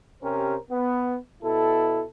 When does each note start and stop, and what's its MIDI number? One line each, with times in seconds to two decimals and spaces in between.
0.22 0.55 48
0.22 0.55 61
0.22 0.55 67
0.22 0.55 70
0.22 0.55 72
0.70 1.16 59
1.43 2.04 47
1.43 2.04 64
1.43 2.04 69